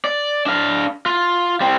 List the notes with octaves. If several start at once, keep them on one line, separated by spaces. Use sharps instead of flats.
D5
D4 F5
F4
G3 C4